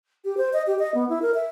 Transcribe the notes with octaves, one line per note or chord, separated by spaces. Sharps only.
G4
C5
D#5
G4
D#5
B3
E4
A#4
E5